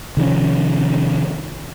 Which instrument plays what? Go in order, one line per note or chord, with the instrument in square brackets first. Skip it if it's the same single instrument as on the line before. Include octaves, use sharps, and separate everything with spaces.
[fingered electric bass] C3 D#3 F3 C#4